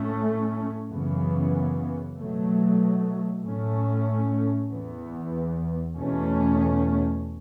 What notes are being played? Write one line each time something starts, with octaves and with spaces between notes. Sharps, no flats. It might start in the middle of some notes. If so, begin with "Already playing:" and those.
Already playing: A2 A3 C#4
F#2 C#3 E3 B3
B2 F#3 A3
A2 A3 C#4
E2 E3 B3
E2 B2 A3 C#4